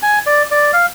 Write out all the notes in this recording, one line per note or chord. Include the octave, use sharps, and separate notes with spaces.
G#5
D5
D5
F5